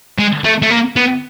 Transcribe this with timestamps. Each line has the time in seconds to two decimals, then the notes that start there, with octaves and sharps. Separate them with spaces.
0.18 G#3
0.45 A3
0.62 A3
0.70 A#3
0.96 B3